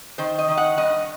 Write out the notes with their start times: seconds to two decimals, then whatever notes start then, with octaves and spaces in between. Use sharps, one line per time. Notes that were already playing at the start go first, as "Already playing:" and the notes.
0.18 D#3 C5
0.38 D#5
0.48 D#3
0.57 F#5
0.77 G2 D#5